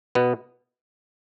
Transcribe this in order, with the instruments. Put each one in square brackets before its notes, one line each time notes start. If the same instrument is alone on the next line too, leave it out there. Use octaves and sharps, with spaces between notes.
[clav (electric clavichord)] B2 B3